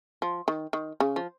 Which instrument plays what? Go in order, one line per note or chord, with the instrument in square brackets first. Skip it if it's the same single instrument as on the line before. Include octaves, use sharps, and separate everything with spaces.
[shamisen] F3
D#3
D#3
C#3
F3